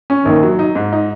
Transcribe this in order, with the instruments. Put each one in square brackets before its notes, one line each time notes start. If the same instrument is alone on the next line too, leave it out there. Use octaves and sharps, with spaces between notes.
[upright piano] C#4
[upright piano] A#1 [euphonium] D#3
[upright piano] F#3
D#4
G#2
D#4